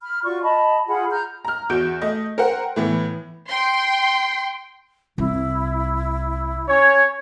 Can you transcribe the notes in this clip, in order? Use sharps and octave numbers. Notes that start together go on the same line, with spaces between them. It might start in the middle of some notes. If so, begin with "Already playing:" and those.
B5 F6
F4 F#4 D5 C#6
D#5 A5 B5
F4 G#4 F#5 B5
A#5 F6 G6
A#5 F6
E2 F#4 G6 D7
A3 D#5
A#4 C5 F#5 G5
A2 E3 B3
G5 C6
C2 E4
C#4 C#5